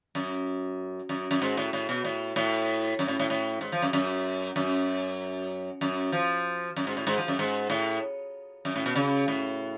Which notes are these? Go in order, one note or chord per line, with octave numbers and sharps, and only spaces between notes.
F#2
F#2
F#2
G#2
A2
A2
B2
A2
A2
F#2
A2
A2
A2
G#2
F3
F#2
F#2
F#2
F#2
F3
F#2
G#2
A2
G#2
F3
F#2
G#2
A2
F#2
A2
B2
C#3
A2